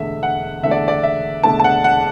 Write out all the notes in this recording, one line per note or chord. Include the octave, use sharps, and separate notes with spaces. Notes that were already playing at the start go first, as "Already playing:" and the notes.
Already playing: E1 E2 D3 A3 E5
F#5
E1 E2 D3 A3 E5
D5
D5
E5
E1 E2 D3 A3 A5
A5
F#5
F#5